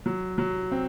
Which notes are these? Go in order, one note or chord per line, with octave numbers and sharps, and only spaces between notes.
F#3
F#3
C4